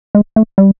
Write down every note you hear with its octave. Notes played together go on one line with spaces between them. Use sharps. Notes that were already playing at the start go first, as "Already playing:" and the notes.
G#3
A3
G3